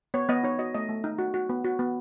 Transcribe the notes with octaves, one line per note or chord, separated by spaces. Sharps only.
B3 C#5
B3 D#5
D#4 C#5
F#4 D#5
A3 D#5
A3
D#4
F#4
F#4
B3
F#4
B3